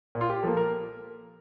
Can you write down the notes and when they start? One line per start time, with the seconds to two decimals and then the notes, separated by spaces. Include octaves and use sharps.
0.15 A#2
0.21 F4
0.30 G4
0.43 F3 A#3 A4
0.57 A#4